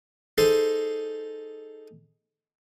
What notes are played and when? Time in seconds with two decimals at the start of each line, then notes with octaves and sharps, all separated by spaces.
0.38 D#4 G#4 A4 C5 C6